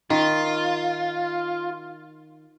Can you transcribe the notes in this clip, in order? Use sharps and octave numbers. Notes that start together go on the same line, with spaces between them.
D#3 F4